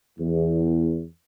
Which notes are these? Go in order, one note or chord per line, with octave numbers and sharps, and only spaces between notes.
E2